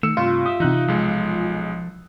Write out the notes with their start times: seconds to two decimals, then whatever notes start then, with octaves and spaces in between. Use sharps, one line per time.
0.03 D#3 A3 E6 C#7 E7
0.17 G2 C3 F4
0.46 G4 E5 D#6
0.60 C3 E3 D#4 F#6
0.88 B1 F3 G#3 A4